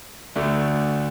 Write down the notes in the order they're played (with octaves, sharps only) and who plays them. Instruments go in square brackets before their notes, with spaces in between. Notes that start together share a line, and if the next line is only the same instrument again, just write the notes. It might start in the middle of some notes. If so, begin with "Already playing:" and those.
[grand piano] D2 D3 A3 D4